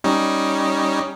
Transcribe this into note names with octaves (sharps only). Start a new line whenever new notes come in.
G3 C#4 D#4